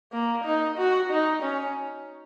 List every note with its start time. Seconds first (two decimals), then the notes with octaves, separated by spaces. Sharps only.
0.12 A#3
0.44 D#4
0.77 F#4
1.10 D#4
1.42 C#4